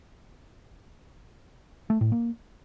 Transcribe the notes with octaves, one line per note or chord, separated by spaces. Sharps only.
A3
A2
A#3